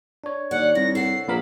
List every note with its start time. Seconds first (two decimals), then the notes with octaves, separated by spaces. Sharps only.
0.24 D4 C#5
0.51 D#2 D5 F#5
0.75 C2 D#3 A#6
0.95 A4 F#5 C7
1.28 A#1 A#3 B3 A#4 B5